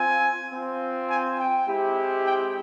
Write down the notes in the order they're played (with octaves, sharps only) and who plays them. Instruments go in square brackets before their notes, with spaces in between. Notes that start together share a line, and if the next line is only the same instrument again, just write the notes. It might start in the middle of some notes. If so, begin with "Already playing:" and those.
Already playing: [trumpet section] C4 F4 G#5
C4 F4
G#5
G5
G#3 C4 E4 G4
G5